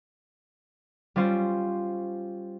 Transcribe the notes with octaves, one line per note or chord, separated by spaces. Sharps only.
G3 C#4 F4 C5